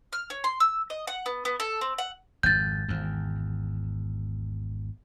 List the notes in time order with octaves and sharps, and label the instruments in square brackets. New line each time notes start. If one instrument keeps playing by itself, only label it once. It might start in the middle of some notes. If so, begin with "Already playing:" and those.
[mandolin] F6
C#5
C6
E6
D#5
F#5
B3
B3
A4
C4
F#5
[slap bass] G#1 F2 [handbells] G6 A6
[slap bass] G#1 E2